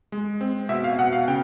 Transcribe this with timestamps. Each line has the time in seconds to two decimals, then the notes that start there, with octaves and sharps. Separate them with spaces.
0.12 G#3
0.41 C4
0.69 B2 E5
0.84 F5
0.99 B2 F#5
1.13 F5
1.28 C#3 G5